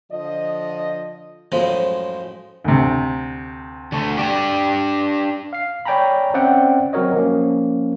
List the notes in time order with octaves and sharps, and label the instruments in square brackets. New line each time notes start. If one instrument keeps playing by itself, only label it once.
[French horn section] D3 F3 D#5
[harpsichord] F#2 A2 F3 G#3
[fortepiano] D2 C3
[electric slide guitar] D3 A3
D4 G4 D5
[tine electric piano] F5 C7
C#5 D5 G5 G#5 A#5 B5
C4 C#4 D5 E5 F#5 G5
F#3 C4 F#4 A#4 C#5 D#5
F3 A#3 C#4